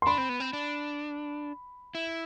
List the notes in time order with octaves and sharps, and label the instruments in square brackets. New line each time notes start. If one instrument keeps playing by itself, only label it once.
[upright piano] C6
[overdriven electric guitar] D4 [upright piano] B5
[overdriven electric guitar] C4
B3
C4
D4
E4